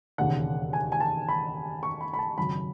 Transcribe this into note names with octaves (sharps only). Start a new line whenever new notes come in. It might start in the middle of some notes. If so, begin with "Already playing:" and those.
E1 D#2 C#3 F#5
G#5
G#5
A5
B5
C#6
B5
B5
A5
G#1 F#2 C#3 B5